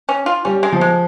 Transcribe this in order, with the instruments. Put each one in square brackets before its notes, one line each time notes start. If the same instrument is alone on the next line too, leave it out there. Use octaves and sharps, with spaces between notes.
[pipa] C#4
F4
[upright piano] G3 [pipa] C#4
[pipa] G#3
[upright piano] F3
[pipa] G#3